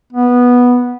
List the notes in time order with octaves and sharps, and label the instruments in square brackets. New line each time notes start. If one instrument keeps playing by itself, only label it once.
[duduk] B3